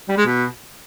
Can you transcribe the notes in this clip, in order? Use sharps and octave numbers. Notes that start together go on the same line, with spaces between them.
G3
G#3
B2